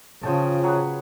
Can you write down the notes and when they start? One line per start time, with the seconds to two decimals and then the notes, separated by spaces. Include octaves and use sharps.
0.23 C#3 F3 G5 A5
0.64 F#3 G#4 B4